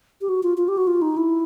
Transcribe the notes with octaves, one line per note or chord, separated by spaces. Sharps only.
G4
F#4
F4
F4
G4
F#4
F4
D#4
E4